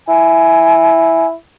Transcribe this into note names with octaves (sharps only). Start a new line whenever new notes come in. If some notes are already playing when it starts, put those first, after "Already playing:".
E4 G#5